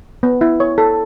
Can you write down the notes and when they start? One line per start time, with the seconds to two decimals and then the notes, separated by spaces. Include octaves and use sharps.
0.23 B3
0.41 E4
0.60 C#5
0.78 A4